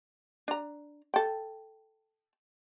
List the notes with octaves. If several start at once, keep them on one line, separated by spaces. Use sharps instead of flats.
D4 A#5
A4 G5